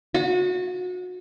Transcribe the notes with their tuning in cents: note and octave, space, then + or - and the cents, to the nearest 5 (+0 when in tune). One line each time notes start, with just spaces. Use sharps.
F#4 -30